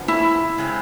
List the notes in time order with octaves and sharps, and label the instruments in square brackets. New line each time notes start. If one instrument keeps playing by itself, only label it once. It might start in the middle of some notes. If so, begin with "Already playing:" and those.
Already playing: [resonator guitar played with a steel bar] C#3 F3 G#3 B3 D4
[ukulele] E4
[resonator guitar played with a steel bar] C#3 G#3 C4